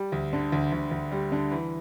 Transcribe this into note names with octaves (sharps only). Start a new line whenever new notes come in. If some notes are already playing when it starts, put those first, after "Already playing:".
Already playing: G3
D2
D3
D2
D2
D2
G3
D3
E3